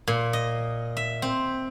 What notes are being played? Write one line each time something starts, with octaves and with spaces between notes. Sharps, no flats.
A#2
D#5
E5
C4